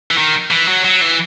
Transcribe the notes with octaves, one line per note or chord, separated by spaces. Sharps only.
E3
D#3
E3
F#3
F#3
E3